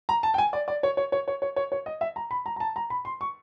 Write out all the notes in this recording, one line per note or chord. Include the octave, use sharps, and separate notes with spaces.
A#5
A5
G5
G#5
D5
D5
C#5
C#5
C#5
C#5
C#5
C#5
C#5
D#5
E5
A#5
B5
A#5
A#5
A5
A#5
B5
C6
C#6